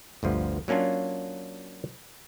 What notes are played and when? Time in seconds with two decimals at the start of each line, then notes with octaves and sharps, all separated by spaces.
0.23 G1 D2 F3
0.68 F#3 A#3 C#4 D4 F4